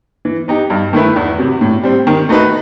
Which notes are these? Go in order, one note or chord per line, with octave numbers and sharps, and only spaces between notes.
E3
B3 D#4 G4
G2
D#3 A3 E4 B4
E2
C3 F#3
A2
G3 C4
D#3
A3 D#4 F#4 B4